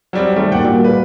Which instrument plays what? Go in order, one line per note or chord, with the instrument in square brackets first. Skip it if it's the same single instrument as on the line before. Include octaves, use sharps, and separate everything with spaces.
[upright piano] F#3 G3 C4
D#3 G3 A3
[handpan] G3 A#3 [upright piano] D5 F#5 G5
[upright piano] A#2 [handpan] F#4
[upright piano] B4